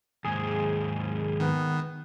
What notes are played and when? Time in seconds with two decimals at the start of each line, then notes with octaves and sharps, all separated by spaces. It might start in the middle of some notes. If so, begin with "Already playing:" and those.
0.25 D#2 G#2 G#4
1.40 D#3 B3